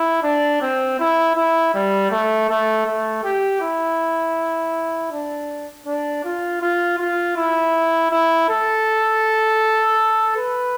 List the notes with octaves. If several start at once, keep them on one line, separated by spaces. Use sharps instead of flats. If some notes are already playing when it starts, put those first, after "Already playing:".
Already playing: E4
D4
C4
E4
E4
G3
A3
A3
A3
G4
E4
D4
D4
F4
F4
F4
E4
E4
A4
B4